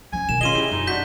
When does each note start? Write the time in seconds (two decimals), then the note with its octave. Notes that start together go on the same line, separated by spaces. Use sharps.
0.13 F3 C#4 G#5
0.29 B2 D#3 E7
0.41 C#4 F4 G#4 D#5 C6 D#7 G7
0.55 E4 G4 G#4
0.71 F#2 D#4
0.87 D4 F#4 G6 B6